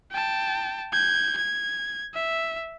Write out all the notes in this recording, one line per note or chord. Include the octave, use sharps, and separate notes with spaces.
G5 A5
G6 G#6
G#6
E5